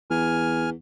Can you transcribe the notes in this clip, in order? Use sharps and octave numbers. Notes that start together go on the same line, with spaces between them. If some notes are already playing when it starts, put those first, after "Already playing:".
E2 G#5 F6